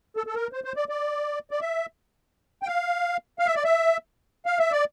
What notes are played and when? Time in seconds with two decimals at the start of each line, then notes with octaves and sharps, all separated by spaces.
0.17 A4
0.27 A4
0.35 A#4
0.53 C5
0.64 C5
0.76 D5
0.89 D5
1.51 D5
1.61 E5
2.63 G5
2.67 F5
3.39 F5
3.47 E5
3.55 D5
3.64 E5
4.46 F5
4.59 E5
4.72 D5